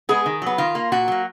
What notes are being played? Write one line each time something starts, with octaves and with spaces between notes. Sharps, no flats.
G#3 B3 G#4
D#3
F#3 B3
D#3 F4
A#3
A#2 F#4
F#3 A#3